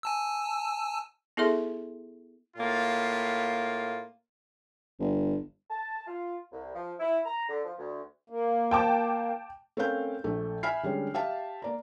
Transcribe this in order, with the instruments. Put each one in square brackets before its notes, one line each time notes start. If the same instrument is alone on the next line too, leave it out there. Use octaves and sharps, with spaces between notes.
[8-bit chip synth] G#5 A5 E6
[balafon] B3 E4 G#4 A4 E5 C6
[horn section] A2 A#3 F4
[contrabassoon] G1
[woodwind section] A5
F4
C2
F3
E4
A#5
D3
F3
D2
[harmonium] A#3
[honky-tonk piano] G5 A5 D6
[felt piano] A3 C4 C#4 A#4 F5 G6
A#1 A3
E5 G#5 B5 F6 C7
D3 G3 G#3 C#4
G4 E5 F5 A5
A#3 D5 A#5